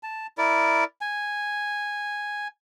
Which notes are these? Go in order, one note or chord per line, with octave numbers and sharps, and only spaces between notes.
A5
E4 A#4 D5
G#5